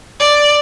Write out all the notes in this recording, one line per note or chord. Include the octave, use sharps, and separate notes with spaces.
D5